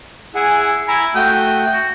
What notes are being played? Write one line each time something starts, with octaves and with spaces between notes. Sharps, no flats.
E4 G#4 F#5 G#5
E4 G#5 A#5 B5
A3 F#4 G5 D#6
F#4